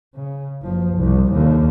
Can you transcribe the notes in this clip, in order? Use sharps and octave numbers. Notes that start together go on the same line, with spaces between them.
C#3
F#1 F3
C2
D#2 D3